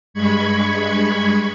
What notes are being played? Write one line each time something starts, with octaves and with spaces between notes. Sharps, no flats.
G2 G#3 B5 C#6 G#6